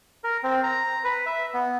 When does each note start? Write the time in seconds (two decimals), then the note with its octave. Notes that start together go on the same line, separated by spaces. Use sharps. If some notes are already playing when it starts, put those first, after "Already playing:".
0.24 A#4
0.43 C4
0.63 A#5
1.04 B4
1.26 E5
1.54 B3